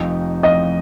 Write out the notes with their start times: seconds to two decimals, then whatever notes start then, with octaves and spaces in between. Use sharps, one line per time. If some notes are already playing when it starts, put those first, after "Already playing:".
Already playing: F1 F2 F3 C4 D#4
0.43 F1 F2 F3 C4 D#4 D#5